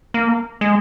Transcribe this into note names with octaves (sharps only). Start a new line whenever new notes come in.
A#3
G#3